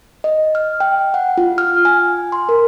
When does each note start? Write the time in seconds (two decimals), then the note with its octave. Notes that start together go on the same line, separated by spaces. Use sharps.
0.24 D#5
0.55 F6
0.80 G5
1.14 F#5
1.38 F4
1.58 F6
1.85 G#5
2.32 C6
2.49 A#4